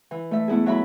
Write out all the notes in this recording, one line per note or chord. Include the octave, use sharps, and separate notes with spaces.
E3
A3 E5
A3 B3 E4 G#4
F#3 E4 E5 B5